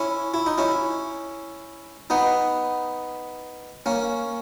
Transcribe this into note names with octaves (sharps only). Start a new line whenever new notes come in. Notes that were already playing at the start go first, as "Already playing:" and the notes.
Already playing: C#4 E4
E4
D#4
C#4 E4
B3 D#4
A#3 C#4